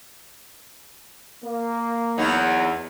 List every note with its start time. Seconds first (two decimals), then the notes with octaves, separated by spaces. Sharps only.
1.44 A#3
2.18 E2 F#3 D#4